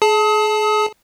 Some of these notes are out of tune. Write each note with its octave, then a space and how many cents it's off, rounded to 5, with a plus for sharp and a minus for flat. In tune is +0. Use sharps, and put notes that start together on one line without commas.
G#4 +35 A5 +0 D#6 +40